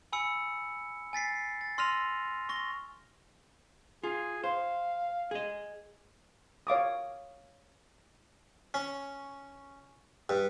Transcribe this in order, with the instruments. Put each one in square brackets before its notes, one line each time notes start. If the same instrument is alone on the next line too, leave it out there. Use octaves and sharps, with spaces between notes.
[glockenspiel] G#5 B5 E6 C#7
G#5 A6 B6 C7
A6
C6 E6 F6 A#6 D#7 F7
C#6 A#6 G7
[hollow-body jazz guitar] F4 [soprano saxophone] G#4
[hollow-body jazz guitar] C5 [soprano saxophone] F5
[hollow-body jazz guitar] G#4 D#5
[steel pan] C#5 F5 D6 D#6
[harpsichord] C#4
G2